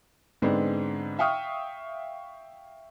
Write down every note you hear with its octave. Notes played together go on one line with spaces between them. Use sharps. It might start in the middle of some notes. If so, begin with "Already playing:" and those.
G#2 D3 G#3 B3 C4 D4
E5 F5 G5 C#6 D#6 F6